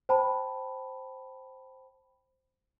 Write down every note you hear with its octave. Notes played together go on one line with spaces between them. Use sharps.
C5 G5 A5 B5